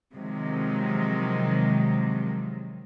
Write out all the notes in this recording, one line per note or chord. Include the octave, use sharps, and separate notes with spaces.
C3 D#3 F3 F#3 G#3